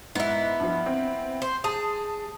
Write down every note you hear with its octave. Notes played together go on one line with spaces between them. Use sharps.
G#2 B3 E4
G2 F3
C4
C5
G#4 A5 D#6